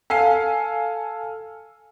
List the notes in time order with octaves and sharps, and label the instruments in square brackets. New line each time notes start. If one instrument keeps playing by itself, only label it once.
[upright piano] A4 F5 G#5 C7